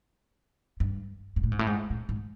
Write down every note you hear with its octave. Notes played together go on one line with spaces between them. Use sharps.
G2
G#2
A2
G#2
A2
G#2
A2
G#2